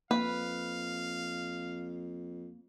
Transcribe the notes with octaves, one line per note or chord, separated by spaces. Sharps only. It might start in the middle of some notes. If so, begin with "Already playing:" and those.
F2 A#3 B4 F5